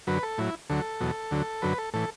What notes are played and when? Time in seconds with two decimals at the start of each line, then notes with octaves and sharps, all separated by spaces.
0.07 F#2 D3 F#3 B4
0.23 A4
0.38 A2 F#3 E4
0.70 D2 D3 F#3 A4
1.00 E2 B2 F#3
1.31 D2 D3 F#3
1.62 F#2 D3 F#3 B4
1.78 A4
1.94 A2 E3 A4